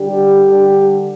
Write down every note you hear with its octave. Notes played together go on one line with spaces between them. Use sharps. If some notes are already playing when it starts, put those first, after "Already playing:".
Already playing: D3 G3 D4 G4
D3 G3 D4